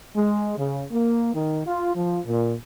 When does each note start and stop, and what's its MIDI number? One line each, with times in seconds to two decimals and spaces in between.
0.15 0.55 56
0.57 0.83 49
0.92 1.31 58
1.33 1.60 51
1.65 1.94 65
1.95 2.18 53
2.26 2.53 46